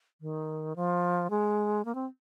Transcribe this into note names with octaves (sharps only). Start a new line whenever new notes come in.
D#3
F3
G#3
A#3
C4